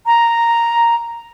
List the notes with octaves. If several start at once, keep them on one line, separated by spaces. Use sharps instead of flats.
A#5